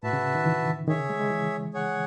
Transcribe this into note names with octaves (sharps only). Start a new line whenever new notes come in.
A2 F#4 B4 E5 A5
C#3
D#3
E3
D#3 G#4 C#5 E5
C#3
G#3
G#3
E3
G#4 C#5 F#5